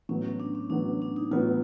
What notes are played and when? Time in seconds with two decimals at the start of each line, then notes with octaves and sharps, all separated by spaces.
0.09 A2 F#3 B3 C#4
0.25 C#4
0.40 D4
0.55 C#4
0.70 A2 F#3 B3 D4
1.02 D4
1.16 D#4
1.31 A2 F#3 B3 F4